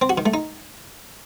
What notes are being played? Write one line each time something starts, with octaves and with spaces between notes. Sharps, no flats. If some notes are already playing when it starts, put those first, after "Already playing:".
C4
F#4
D#3
A3
D#4